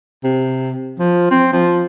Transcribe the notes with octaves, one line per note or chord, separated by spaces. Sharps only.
C3
F3
C4
F3